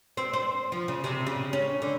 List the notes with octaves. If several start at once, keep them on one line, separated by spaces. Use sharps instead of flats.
C4
C5
F3
C#3
C3
C#3
C#4
D3